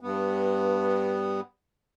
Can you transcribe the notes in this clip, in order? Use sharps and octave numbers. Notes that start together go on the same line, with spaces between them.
G2 B3